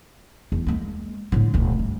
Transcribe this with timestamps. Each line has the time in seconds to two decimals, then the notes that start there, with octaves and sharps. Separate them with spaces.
0.52 E2
0.67 G#3 A#3
1.32 A2 D3
1.54 E1 D2
1.79 G2